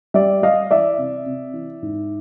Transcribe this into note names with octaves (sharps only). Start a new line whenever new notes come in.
G3 D5 E5
G3 D#5 F5
E3 D5 E5
C3
C3
E3
G#2